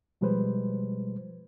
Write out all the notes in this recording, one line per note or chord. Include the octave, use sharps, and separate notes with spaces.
B2 F3 G3 G#3 B4 C5